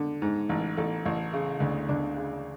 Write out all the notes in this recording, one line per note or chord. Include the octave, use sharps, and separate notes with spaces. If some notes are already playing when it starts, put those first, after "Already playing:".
Already playing: D3
G#2
A1
A1 A4
A1
C#3
D2
D2 D4
C#3